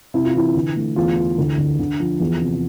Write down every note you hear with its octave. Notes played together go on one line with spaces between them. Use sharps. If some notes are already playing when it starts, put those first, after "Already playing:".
C3 E4
F4
E3 E4
D3
A3
E2 F4
E3
D2
D3
D3
F3
E2
C3